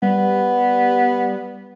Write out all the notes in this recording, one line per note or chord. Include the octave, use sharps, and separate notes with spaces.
G3 B3